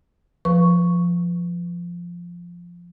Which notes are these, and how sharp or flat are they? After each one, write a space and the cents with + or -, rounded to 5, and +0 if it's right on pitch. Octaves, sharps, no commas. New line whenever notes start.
F3 -5 B4 +0 C#6 +0